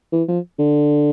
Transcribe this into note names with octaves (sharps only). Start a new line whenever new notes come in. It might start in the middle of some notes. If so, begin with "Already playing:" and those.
E3
F3
D3